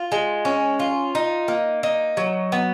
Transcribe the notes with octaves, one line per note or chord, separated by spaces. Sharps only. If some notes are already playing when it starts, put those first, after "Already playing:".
Already playing: F4
G#3
C#4
F4
D#4
A#3
D#4
F#3
B3